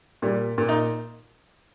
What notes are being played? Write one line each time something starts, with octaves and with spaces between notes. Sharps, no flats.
A#2 G3
A#2
D#4